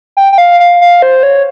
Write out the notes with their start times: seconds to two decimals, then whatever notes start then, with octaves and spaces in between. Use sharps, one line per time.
0.17 G5
0.33 G5
0.38 F5
0.60 F5
0.81 F5
1.02 C5
1.23 C#5